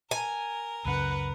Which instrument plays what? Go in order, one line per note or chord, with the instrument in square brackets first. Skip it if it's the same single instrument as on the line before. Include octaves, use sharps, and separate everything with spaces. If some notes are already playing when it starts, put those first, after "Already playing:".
[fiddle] A#4 [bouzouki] G#5
[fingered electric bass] C#2 F#2 C#3 [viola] B4 F#5